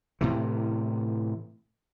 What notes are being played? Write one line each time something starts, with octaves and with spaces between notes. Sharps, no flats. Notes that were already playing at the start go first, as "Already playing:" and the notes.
A2 C3 E3